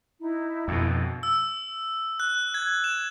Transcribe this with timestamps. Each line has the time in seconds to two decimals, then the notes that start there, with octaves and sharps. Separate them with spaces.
0.20 D#4 E4
0.68 F2 B2
1.23 E6
2.20 F#6
2.54 G#6
2.84 E7